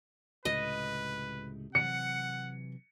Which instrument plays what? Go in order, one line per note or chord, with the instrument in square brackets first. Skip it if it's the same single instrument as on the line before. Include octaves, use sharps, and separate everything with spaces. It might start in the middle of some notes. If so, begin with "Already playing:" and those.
[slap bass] C#2 A2 C3 [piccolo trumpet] B4 [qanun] D#5
[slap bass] C3 E3 F#3 [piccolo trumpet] F#5 [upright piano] C#7